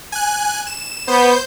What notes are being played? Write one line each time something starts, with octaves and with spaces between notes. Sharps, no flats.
G#5 F#6
E7
B3 C5 G6